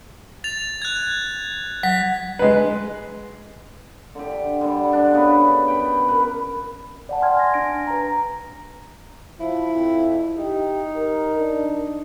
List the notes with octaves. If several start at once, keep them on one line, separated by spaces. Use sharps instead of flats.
A6 F7
F#6 G#6
F#3 B6
G#3 B4
D3 G4
D3 G3
D4
C#3 B3 D4 B4
B4 G5
A#4 B4
D5 F#5 A5
G5 G#5 C6 F6 G#6
A#6
D4 G#5 A#6 D7
B4 A#5
F3 E4
F2
D#4 G4
A#4
D4